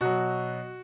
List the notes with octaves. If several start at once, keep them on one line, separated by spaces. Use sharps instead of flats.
B2 F#3 F#4